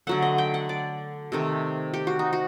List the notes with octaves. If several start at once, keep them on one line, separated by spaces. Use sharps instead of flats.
D3 F#3 A3 F#5
D#5
G5
F#5
D5
C3 D#3 A3
G4
F#4
D#4
F#4